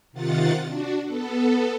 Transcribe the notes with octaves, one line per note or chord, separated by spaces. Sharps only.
C3 D#3 F4 F#5 A6
D4 F#4
B3 A4